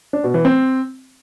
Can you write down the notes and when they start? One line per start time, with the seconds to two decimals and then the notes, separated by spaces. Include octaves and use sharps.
0.13 D4
0.24 B2
0.34 E3
0.45 C4